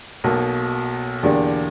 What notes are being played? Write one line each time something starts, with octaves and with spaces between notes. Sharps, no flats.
B1 B2 A#3
E2 D3 A#3 D4 G4